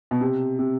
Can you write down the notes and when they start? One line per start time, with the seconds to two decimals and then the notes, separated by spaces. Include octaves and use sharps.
0.11 B2
0.21 C3
0.59 C3